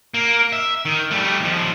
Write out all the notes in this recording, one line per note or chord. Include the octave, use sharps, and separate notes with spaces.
A#3
E5
D#3
G3 A3
D#2 F3